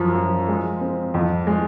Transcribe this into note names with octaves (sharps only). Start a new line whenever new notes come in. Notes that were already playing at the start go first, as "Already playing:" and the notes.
Already playing: F#2 F3
F3
G#3
C4
F2
G#3